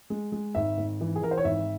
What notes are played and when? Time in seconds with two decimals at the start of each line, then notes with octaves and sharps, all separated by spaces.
0.10 G#3
0.32 G#3
0.55 G#1 E5
0.78 G#1
1.01 E3
1.16 G#4
1.22 E3 A#4
1.31 C5
1.38 C#5
1.45 G#1 E5